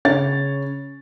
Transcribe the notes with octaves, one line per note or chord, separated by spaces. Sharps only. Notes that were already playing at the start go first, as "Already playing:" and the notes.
C#3 C#5 A6